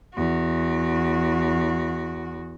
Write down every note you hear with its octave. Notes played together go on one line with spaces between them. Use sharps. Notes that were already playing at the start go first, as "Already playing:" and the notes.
E2 F#4